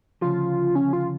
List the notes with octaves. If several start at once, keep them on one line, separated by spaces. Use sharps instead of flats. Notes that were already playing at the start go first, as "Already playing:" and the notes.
D2 C#3 F3 F4
C#4
F4